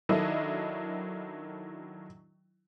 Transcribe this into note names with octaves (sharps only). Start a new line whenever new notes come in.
D#3 F#3 D4 E4 A4 D#5